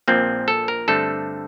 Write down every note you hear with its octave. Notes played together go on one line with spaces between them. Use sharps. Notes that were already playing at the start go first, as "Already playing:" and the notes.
A#1 A#2 F3 A#3 C4
A4
A#4
G2 D3 A3 C4 A4